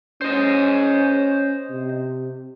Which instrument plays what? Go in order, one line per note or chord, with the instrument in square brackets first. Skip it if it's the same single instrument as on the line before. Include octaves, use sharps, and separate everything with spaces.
[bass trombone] C#4 [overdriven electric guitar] C5 D#5
[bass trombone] C3